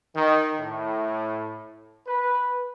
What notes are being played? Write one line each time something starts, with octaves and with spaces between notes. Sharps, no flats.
D#3
A2
B4